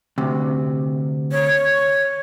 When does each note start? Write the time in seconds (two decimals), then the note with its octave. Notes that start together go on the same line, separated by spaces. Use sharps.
0.18 D2 C3
1.31 C#5